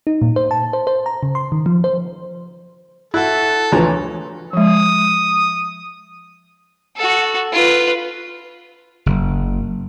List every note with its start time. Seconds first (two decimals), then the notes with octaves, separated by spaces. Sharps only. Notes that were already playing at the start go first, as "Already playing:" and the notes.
0.07 D#4
0.22 A#2
0.36 C5
0.51 A5
0.73 C5
0.87 C5
1.06 A#5
1.23 C#3
1.35 C6
1.52 D#3
1.66 F3
1.84 C5
3.14 E4 F#4 A4 F#6
3.72 D2 E3 F3 C#5 A#5
4.53 F3 G#3 D#6
6.97 F#4 A4
7.53 F4 B4
9.06 F#1